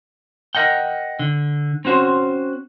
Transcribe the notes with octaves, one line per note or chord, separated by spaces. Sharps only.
A#4 B4 D#5 F#5 G5
D3
C4 C#4 F#4 C5